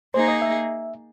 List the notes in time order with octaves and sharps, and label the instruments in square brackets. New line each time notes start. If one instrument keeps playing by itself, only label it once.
[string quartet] A#3 D#4 G#4 [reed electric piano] C5
[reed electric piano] D#5
E5